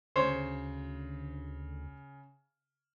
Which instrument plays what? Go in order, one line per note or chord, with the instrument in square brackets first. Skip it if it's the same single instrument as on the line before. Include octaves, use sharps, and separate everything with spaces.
[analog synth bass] D2 [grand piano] C#3 [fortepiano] C5 C#5